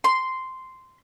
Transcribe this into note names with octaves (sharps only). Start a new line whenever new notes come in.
C6